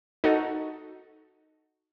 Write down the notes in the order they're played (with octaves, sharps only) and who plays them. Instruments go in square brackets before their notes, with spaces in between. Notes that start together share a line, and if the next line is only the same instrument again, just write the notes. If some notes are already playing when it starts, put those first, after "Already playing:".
[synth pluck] D#4 F#4 A4